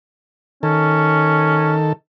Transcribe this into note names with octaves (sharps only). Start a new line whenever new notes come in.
D#3 C#4 A4